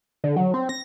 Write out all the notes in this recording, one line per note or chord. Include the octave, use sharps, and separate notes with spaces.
D3
F#3
C4
A#6